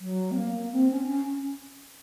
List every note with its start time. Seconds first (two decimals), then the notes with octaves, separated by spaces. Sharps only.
0.01 F#3
0.31 C4
0.36 A#3
0.73 C4
0.91 C#4
1.09 C#4